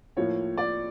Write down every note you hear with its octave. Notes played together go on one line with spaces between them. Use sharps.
A2 F3 A#3 C#5
D5